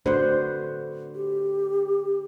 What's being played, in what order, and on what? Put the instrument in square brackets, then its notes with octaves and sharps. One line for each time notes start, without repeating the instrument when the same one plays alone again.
[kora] D3 B4 F#5 [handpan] A3 F#4 C5
[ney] G4